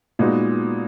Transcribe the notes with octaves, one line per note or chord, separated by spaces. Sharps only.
A#2 G#3 B3 D#4 F#4